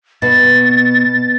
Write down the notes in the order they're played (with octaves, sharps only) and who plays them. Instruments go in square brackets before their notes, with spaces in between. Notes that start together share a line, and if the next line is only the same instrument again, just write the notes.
[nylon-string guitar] B2 [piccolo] A6